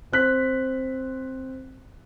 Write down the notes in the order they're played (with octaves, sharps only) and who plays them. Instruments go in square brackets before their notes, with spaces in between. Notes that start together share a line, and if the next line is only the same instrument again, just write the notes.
[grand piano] C4 F#6 B6